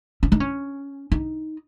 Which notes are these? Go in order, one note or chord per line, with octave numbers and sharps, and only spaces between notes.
C#4
D#4
C#4
D#4